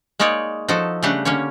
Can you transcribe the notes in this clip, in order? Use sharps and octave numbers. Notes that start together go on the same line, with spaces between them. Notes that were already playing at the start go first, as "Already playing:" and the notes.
G#3 A#3 D#4 C#5 D5
F3 D#4 F#4 A4
C#3 G3 A3 D4 G4 F#5
D3 A#3 C#4 C#5